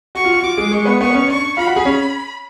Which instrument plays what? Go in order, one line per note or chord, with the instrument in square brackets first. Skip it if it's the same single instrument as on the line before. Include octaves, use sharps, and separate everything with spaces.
[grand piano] F#4 [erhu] C#6
[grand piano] F4
F#4
[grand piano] F4 [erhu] D6
[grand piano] G#3 G#4
[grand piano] G#3 G#4 [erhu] C#6
[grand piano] B3 B4
[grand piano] B3 B4 [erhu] C#6
[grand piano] B4
C#4 C#5
[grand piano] D4 D5 [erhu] C#6
[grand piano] F4 F5 [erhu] B5
[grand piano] F#4 F#5
G#4 G#5
C#4 C#5